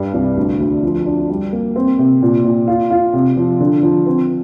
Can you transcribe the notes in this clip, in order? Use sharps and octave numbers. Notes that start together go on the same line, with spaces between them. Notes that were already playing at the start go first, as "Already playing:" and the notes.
Already playing: G2 G3
C2
D2
D2
F3
D4
G3
A#3
C4
C3
A#2
A#2
F4
F4
C3
F3
D3
F3
C4